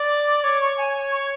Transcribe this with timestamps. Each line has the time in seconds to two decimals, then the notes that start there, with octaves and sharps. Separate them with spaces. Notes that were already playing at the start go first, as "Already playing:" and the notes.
Already playing: D5
0.09 D6
0.26 D6
0.43 C#5 D6
0.60 C#6
0.77 G#5
1.11 C#6